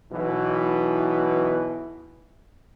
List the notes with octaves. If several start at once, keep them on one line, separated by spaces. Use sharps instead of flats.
B1 B2 E3